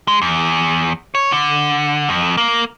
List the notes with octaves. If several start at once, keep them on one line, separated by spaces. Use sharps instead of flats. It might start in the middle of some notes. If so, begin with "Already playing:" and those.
G#3
E2
C#5
D3
F2
A#3